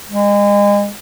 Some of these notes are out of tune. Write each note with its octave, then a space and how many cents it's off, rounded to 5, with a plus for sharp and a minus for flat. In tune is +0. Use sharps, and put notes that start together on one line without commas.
G#3 -35